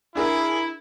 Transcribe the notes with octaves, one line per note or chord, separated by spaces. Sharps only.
D4 E4 G#4 A#4